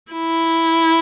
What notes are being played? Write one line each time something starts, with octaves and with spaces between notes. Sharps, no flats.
E4